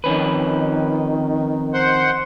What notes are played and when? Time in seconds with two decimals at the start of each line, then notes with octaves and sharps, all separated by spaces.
0.04 F2 D#3 C#4 B4
1.74 C5 F#5 C6